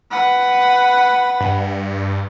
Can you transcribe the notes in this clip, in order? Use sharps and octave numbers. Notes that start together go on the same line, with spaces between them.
B4 F#5
G2